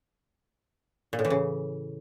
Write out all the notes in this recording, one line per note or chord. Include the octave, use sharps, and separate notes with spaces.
A#2
A2
E3
C#3